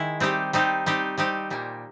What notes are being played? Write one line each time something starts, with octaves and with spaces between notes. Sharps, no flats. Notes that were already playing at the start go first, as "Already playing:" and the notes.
Already playing: D#3 G#3 E4
G3 C4 D#4 G4
G3 C4 D#4 G4
G3 C4 D#4 G4
G3 C4 D#4 G4
A#2 G3 A#3